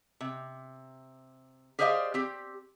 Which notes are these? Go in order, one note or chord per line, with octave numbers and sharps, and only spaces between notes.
C3
G4 G#4 C5 D5 D#5 F5
C4 G4